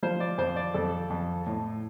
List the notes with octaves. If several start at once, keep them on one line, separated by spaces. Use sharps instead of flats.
F3 C5
D5
F2 C5
D5
F2 A4
F2
A2